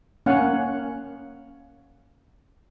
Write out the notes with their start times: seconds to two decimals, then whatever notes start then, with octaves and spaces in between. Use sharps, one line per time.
0.26 A#3 C#4 F5 F#5 G#5